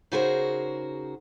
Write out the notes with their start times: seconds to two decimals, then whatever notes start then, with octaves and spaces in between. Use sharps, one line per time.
0.12 C#3 D#4 F#4 G#4 A#4 C5